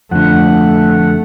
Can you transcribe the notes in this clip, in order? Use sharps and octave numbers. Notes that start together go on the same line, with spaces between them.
F2 D3 A3 F#5